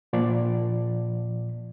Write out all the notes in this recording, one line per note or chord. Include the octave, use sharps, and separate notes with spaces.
A#2 F3 D5